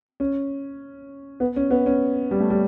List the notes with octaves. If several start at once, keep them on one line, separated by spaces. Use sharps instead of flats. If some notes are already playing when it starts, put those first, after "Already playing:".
C#4
B3
C#4
B3
C#4
G3
A3
G3